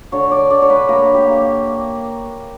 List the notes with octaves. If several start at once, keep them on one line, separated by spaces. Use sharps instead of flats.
D3 C#5
D5
D3 D5
C#5
B4
A#3 A#4
G4
A#3